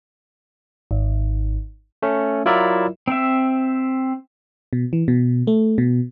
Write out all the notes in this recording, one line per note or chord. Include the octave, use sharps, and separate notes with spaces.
G#1
A3 C#4
F#3 E4 F4 A#4 D5 E5
C4 E5
B2
E3
B2
A3
B2